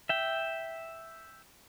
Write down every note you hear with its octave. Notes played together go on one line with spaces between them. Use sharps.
E5 G5